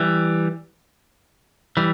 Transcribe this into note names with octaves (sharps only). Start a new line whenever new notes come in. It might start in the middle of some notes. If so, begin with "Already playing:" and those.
Already playing: E3 G3
E3 G3